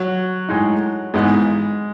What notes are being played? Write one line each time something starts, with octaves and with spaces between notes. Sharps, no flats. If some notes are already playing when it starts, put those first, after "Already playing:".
Already playing: F#3
A2 G#3 D#4
G#1 G#2 E3 G#3 B3 D#4